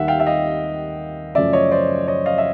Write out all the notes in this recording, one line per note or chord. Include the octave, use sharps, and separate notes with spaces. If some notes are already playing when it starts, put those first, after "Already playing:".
Already playing: D#2 D#3 G3 E5 F#5
F5 G5
E5
D#5 F5
F#2 C#3 F3 A3 C#4 D5 E5
C#5 D#5
C5 D5
C#5 D#5
D#5 F5
E5